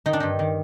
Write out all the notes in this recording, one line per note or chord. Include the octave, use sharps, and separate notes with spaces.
D#3 D#4
D4
G2 D#4
D#3